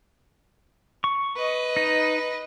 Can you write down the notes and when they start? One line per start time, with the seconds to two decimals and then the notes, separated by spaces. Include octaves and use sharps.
1.04 C#6
1.36 B4 D#5
1.77 D#4